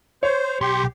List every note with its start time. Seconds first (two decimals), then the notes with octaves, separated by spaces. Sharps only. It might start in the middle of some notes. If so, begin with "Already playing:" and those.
0.23 C5 C#5
0.61 B1 G4 C6